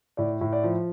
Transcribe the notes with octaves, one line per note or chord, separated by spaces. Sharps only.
A2 D5
A2
D5
F3